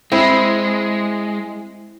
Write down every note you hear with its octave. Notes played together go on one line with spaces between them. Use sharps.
G#3 C4 E4